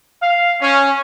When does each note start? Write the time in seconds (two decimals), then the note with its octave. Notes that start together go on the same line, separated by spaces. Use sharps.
0.22 F5
0.61 C#4